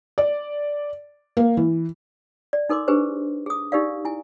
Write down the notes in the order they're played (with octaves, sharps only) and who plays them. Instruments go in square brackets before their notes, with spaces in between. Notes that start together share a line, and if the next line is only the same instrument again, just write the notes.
[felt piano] D5
A#3
E3
[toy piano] D5
D#4 A4 A#4 C6 D6
D4 G4 G#4 B4 C5
G#4 D#6
D#4 G4 A#4 D5 F5
E4 G#5